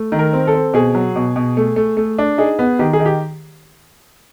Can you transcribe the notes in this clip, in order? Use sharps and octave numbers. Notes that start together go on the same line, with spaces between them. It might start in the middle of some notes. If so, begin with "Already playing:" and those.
Already playing: A3
D#3
A#4
C4
A4
C4
B2 G#4
F#3
B2
B2
A3
A3
A3
D4
D#4 G#4
B3
D#3 G4
G#4
D#3
G4